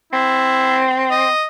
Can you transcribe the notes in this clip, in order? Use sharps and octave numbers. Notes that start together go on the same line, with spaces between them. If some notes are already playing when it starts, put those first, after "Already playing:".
C4 E4
D#5